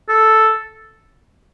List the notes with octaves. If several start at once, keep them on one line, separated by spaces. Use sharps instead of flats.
A4